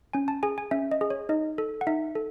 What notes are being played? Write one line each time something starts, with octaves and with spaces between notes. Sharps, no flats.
C#4 G#5
A5
G#4 G#5
G#5
C#4 E5
D#5
G#4
C#5
D#4 D#5
A4
F#5
D#4 E5
A4